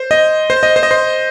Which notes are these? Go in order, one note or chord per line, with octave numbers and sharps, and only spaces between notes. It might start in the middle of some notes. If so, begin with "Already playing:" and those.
Already playing: C5
D#5
C5
D#5
C5
D#5
C5